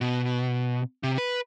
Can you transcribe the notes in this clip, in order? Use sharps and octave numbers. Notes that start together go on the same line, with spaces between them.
B2
C3
B4